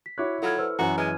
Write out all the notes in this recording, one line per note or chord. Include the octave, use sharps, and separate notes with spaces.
B6
E4 F#4 C#5 D6 F#6
F#3 F4 A4 B5 F6 G#6
A4 B4 C5 E6 F6
F#2 E3 F#4 A#5
G#3 B4 F6 G#6 D#7